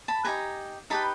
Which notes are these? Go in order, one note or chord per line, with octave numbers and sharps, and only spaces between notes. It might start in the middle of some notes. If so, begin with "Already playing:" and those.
A5 B5
D#4 G4 B4 G#5 A#5
D#4 G4 B4 A5 B5